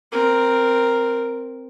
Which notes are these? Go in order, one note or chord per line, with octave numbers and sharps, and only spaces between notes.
C4 A#4